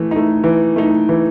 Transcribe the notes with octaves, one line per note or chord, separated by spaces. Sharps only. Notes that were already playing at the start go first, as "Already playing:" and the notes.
Already playing: E3 A3
A3 D#4
E3
A3 D#4
E3